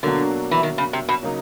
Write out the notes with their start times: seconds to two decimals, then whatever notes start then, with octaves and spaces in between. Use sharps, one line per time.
0.03 B2 D3 F#3 A#3 D4 F#4
0.51 E3
0.63 D#3
0.78 C#3
0.93 C3
1.09 B2
1.23 C#3 F#3 A#3 D#4